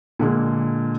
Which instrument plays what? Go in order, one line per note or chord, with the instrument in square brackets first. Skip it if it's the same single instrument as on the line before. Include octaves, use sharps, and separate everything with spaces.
[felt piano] A#2 D3 G#3 A#3